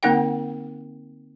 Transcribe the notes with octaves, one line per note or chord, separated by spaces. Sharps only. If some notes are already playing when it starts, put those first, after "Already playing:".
D3 A#3 C4 D#4 F#5 G5